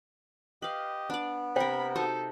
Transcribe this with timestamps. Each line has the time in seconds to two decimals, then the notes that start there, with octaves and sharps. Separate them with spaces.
0.62 G4 B4 D#5 F5
1.10 B3 D4 D5
1.56 C3 A#4 C5 G5 B5
1.96 D#4 F#4 A4 D#5 E5